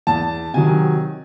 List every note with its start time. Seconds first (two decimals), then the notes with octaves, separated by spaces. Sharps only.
0.07 E2 A5
0.54 C3 D#3 F#3 G#5